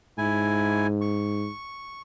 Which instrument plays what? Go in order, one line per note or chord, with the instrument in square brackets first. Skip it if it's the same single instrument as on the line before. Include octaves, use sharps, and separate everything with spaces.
[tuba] G#2 [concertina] E4 G#5
[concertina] C#6